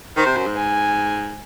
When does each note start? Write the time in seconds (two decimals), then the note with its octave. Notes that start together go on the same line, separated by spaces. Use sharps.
0.16 D#3 C5
0.26 C3
0.36 F#2
0.46 G#2
0.57 G#5